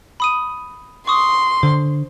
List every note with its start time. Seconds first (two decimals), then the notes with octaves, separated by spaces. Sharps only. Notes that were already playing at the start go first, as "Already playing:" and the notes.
0.20 B5 D#6 D#7
1.07 C6 C#6 D#6
1.63 D3 C5